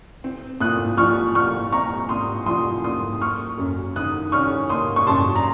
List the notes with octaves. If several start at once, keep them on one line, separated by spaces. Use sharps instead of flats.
C4
A#2 D#6 F#6
F3 C#6 F6
A#2 C#6 F6
C4 A#5 C#6
A#2 C6 D#6
F3 C6 D#6
A#2 C6 D#6
A#3 C#6 F6
F#2
D#3 D#6 F#6
C#4 C#6 F6
A#3 C6 D#6
C#6
F#2 A5 C6
A#5